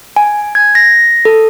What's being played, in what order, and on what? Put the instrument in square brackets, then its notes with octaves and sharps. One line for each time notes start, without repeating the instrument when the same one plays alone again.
[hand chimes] G#5
G#6
A#6
A4